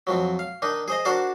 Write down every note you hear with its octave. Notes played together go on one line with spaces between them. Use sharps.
F2 F3 F#3
F5
D#3 D4 D#4
G#4 C5 D#5
D4 F#4 A#4 C5 D5 A5